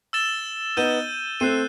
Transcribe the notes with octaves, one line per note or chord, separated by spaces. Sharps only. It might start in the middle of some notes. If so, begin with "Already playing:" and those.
E6 A6 E7 G7
B3 D#4 E6 G6 D#7 G7
A3 C4 F#6 C7 D#7